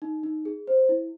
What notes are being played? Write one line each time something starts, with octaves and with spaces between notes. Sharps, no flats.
D#4
D#4
G#4
C5
E4